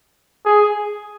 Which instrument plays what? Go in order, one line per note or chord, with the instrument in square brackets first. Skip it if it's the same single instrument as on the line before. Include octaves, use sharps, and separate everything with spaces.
[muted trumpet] G#4